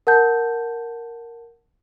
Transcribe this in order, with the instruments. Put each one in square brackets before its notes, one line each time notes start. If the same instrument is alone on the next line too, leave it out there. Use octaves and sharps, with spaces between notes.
[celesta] A#4 F#5 A5 G6